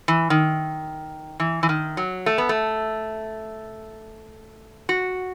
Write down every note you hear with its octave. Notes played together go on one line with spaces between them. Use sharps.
E3
D#3
E3
E3
D#3
F#3
A3
B3
A3
F#4